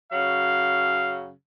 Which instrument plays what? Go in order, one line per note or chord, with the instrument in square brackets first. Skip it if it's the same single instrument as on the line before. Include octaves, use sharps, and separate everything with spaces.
[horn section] F#2 C#3 F#3 F5